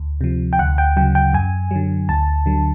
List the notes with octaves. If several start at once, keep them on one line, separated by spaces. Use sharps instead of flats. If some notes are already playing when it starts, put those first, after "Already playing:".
Already playing: D2
C3 F3
G5
D2 F#5
G5
C#3 F#3 G5
G5
F#2 G#5
D3 F#3
D2 A5
D3 F#3